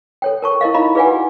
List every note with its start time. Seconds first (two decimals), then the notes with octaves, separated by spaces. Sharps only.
0.22 A4 C#5 G5
0.42 A#4 A5 C#6
0.61 E4 A#4 D#5 F5
0.74 D#4 F4 D#5 F5 A#5 B5
0.95 G#4 B4 D5 F5 F#5 G#5
1.07 F#4